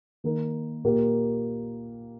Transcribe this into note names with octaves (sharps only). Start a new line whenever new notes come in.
D#3 A#3 D#4 A#4
A#2 A#3 G4 A#4